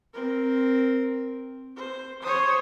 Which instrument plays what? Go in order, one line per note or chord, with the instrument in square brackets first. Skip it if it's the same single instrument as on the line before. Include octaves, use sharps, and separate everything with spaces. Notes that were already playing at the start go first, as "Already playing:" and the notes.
[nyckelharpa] C4 A#4
C5
[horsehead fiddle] C5 C#5 [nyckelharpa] D#6